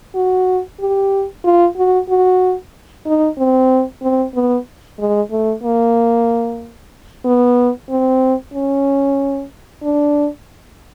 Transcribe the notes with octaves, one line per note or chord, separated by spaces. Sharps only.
F#4
G4
F4
F#4
F#4
D#4
C4
C4
B3
G#3
A3
A#3
B3
C4
C#4
D4